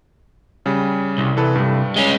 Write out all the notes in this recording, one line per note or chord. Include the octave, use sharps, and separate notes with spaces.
C#3 G3
C2
E3 A4 B4
G2 G3
G#3 C#4